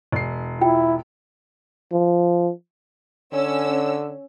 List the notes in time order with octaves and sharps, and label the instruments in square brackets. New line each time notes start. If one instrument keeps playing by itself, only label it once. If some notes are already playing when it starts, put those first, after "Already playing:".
[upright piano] E1 C7
[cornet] E4 [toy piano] F4 G5
[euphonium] F3
[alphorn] D3 [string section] C#4 E6